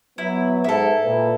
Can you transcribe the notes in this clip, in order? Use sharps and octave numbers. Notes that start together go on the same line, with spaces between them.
F#3 B3 E4
G#2 E4 A4 B4
A#2 B4